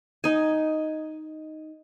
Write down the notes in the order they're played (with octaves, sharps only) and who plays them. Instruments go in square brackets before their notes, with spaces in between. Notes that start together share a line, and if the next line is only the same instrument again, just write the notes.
[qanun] D#4 G#5